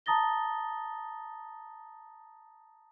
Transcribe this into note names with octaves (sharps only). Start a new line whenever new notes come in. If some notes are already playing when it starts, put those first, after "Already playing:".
A5 A#5 D#6 A6 A#6 G7